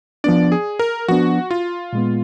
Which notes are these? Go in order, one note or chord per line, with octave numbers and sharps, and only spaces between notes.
F3 B3 D4 D5
G#4
A#4
F3 B3 D4 F#4
F4
A#2 G#3 B3